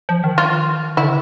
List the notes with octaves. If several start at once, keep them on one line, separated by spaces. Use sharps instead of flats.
F3
D#3
F4
D3 E4